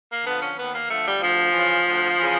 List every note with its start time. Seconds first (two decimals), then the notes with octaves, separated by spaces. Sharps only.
0.10 A#3
0.25 D3 F3 B3
0.41 C#4
0.57 D#2 B3
0.73 A#3
0.89 D3 F3 A3
1.05 G3
1.20 D2 F3
1.52 C#3 E3
1.85 D2
2.16 C#3 E3